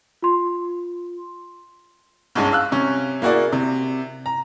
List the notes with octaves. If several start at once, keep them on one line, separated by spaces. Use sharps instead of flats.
F4 C6
C2 G2 G#3 C#4
F5 E6 F#6
C3 C#4
A#3 E4 F#4 G#4 D5
C3
A#5